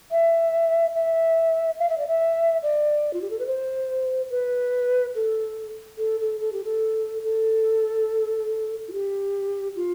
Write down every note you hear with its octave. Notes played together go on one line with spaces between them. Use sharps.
E5
E5
F5
E5
D5
E5
D5
F4
G4
A4
B4
C5
B4
A4
A4
A4
A4
G4
A4
A4
F4
G4
F4